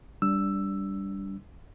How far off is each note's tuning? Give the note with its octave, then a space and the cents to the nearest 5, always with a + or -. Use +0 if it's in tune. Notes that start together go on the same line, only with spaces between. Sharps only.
G3 +0 D4 -20 E6 +5